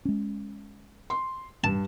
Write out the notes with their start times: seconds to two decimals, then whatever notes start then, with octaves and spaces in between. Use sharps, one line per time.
0.05 G#3 C#4
1.10 C6
1.64 G2 A5